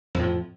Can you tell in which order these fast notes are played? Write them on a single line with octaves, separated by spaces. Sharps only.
F2 A2 F3